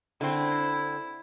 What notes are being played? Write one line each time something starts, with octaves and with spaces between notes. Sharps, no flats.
D3 C4 E4